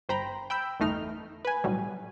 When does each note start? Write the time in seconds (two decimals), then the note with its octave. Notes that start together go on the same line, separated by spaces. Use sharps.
0.09 G1 C5 G5 A#5 B5
0.50 G5 B5 E6 G6
0.80 G1 E2 A3 D#4 F6
1.45 B4 G#5
1.64 B1 A2 F#3 G3